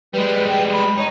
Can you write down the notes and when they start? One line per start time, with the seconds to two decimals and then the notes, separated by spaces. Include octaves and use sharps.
0.13 G3 G#3 B4
0.48 G5
0.72 B5
0.97 D#4 C#5